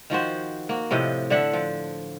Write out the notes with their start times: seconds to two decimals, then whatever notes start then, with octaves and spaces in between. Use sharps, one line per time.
0.10 D#3 F3 F#4 C5
0.69 A#3 F#4
0.91 A2 C3 F3 D#5
1.30 D3 D4 E5 F#5
1.53 F3